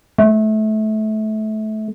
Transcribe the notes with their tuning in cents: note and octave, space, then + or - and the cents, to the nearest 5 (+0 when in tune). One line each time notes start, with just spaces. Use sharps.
A3 -25